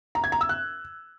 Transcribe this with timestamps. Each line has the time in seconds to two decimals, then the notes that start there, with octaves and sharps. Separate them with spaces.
0.15 A#5
0.24 G#6
0.32 A#5
0.41 E6
0.49 F#6